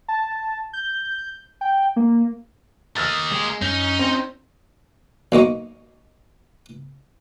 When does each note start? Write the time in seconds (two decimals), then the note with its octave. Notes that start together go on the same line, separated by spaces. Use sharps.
0.08 A5
0.73 G6
1.61 G5
1.96 A#3
2.97 A#3 D#5 E6 F6 A6
3.32 G#3
3.62 F#2 C#4 D#4
3.99 C4
5.32 B1 A#3 D#5 C#6